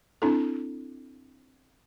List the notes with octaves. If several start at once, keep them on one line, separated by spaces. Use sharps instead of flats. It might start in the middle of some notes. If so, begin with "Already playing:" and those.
C4 D4 E4 A4